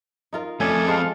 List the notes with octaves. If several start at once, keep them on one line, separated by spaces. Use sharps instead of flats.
D#4 F4 A#4
F2 A3 C#4 A4 D5 D#5 G#5
G#3 C5 F5